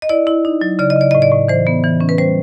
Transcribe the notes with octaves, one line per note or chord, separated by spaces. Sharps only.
D#5
E4 D5
E4
D#4
F#3
C#3 D5
D#5
C#3 D5
A2 D#5
D5
A2
E3 C5
B3
E3
C#4
B4
G3 C5